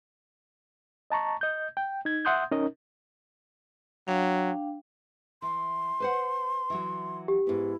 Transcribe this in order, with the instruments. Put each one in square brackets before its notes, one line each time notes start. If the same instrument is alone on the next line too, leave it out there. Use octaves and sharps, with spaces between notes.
[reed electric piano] D#5 A5 A#5 C#6
D#5 G6
G5
D#4 G#6
E5 F#5 C6 D#6 G6
C#4 D#4 A#4 D#5
[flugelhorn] F#3 [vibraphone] D4 F5 G5
[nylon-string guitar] E3 [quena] C6
[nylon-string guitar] B4 C5 F#5
E3 F#3 F#4
[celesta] G4
[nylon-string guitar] G#2 B3 [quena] E4